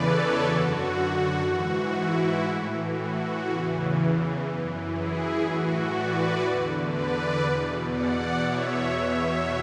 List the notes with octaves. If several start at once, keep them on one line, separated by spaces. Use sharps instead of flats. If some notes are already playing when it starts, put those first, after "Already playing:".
Already playing: E2 C#3 E3 A4 B4 C#5 D5
F#2 D3 F#4
G#2 E3 F#4
E4
A2 E3
F#4
E2 C#3 E3
F#2 E3
E4 G#4
A2 E3 F#4
B4 D5
E2 D3
B4 D5
E2 B2
D5 F#5
E2 B2 C#5 E5
C#5 E5